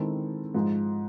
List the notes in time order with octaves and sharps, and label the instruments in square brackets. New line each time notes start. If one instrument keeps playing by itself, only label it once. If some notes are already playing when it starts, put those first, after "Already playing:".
Already playing: [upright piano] D#3 G#3 C4 E4 A4
G#2 F3 G#3